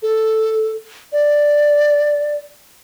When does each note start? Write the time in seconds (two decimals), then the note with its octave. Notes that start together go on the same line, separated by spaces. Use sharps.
0.02 A4
1.13 D5